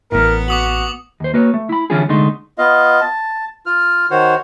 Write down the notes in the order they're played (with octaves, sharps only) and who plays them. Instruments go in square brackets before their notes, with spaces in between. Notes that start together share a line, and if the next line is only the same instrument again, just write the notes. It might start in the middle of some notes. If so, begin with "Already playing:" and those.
[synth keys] A1 A2 [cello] B3 [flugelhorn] A#4
[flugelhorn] F#4 [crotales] D6 D#6 F#7
[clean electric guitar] D#2 C5
A#3 F#4 B4 C#5
A3
E4 B5
D3 E3 G3 C#4 F4 G#4
C2 D3 G#3 A3 D#4 C6
[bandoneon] B3 F4 D#5 F5
A5
F4 F6
D#3 F#4 C5 C#5